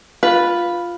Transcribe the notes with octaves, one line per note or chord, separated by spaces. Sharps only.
F4 B4